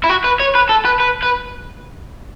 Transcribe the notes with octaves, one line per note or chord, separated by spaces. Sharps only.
E4
F#4
B4
C#5
B4
A4
B4
B4
B4